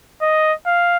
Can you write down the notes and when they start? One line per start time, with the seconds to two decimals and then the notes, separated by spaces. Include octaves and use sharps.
0.22 D#5
0.66 F5